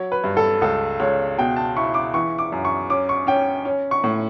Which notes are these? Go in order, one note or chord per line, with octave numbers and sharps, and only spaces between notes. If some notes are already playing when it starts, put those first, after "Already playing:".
Already playing: F#3 C#5
B4
G2
A4
C#2 A4
C#2 C#5
B2 G5
A5
E4 C#6
D6
E3 C#6
D6
F#2
C#6
C#4 D6
C#6
C#4 G5
C#4
C#6
A2